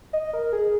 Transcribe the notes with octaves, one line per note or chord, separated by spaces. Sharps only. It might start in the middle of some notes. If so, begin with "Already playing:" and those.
D#5
A#4
G#4